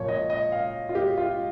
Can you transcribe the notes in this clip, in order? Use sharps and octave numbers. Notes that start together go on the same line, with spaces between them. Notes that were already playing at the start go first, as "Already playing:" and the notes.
Already playing: A#2 F3 C#5
D#5
D#5
F5
F4
G4
F4